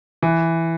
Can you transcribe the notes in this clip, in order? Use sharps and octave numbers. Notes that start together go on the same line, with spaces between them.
E3